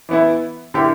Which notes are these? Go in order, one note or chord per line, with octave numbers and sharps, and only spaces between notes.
E3 B3 E4
D3 A#3 E4 G4